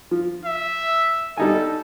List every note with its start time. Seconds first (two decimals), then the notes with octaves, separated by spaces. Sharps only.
0.11 F3
0.45 E5
1.37 G3 D#4 A4 G#5